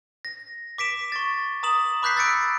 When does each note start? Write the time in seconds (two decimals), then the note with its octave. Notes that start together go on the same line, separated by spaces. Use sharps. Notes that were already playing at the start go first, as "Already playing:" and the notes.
0.25 A#6
0.78 D6 B6 D7 E7
1.12 C#6 A6
1.63 A#5 D#6 E7 F#7
2.02 B5 D6 F#6 G6 B6 C7
2.16 E6 A6 B6 C#7 D7